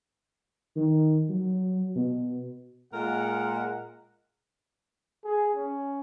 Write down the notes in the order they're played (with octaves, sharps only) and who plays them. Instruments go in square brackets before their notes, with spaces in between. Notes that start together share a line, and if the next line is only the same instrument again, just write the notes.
[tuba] D#3
F#3
B2
[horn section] A#2 G#3 A#4 F#5
[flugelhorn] G#4
C#4